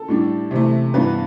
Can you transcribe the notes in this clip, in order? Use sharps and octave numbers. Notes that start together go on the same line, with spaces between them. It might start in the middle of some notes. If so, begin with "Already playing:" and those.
Already playing: A4
A2 G3 D4
C3 E3 A3
G2 E3 B3 D4 B4